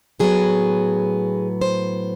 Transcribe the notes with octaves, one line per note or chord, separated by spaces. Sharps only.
A2 F#3 B3 G#4
C5